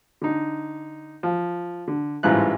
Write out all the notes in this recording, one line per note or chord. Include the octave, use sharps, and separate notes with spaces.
D3 D#4
F3
D3
A1 G#2 E3 G3 F4 F#6